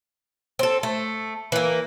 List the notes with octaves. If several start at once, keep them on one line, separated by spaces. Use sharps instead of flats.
C4 A4
A3
E3 A#3